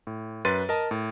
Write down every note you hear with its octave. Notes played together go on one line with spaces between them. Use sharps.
A2
F#2 B4 C6 A6 D#7
A#4 D#5 A5
A2